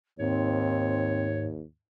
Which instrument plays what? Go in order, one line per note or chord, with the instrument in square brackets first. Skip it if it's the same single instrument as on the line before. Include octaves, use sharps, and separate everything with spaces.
[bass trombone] D#2 [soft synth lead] G#2 [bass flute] C4 [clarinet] C#5